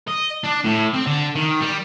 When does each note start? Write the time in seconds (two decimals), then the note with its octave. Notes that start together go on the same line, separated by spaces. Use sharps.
0.08 D#5
0.44 D4
0.65 A2
0.94 C4
1.06 D3
1.35 D#3
1.60 G3